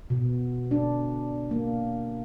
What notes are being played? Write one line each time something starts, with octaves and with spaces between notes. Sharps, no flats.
B2
D4
A#3